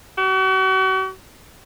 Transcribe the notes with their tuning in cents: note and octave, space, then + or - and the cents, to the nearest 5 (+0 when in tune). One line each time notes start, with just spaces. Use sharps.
F#4 +40